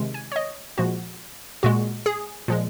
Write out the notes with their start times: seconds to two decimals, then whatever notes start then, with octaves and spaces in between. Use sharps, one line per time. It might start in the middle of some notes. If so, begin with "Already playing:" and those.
Already playing: C3 D#3 G#3
0.14 G#5
0.32 C#5
0.36 D#5
0.78 A#2 F3 G#3 F#4
1.63 A#2 G#3 F#4
2.06 G#4
2.48 A#2 F3 G#3